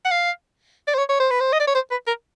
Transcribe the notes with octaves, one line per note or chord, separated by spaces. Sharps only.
F#5
F5
D5
C5
C#5
C#5
C5
B4
C5
D#5
D5
C#5
C5
B4
A#4